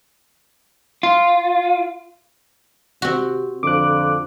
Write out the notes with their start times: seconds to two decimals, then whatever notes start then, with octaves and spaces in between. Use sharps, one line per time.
1.03 F4
3.02 C3 C4 F#4
3.63 F2 D3 D6 F#6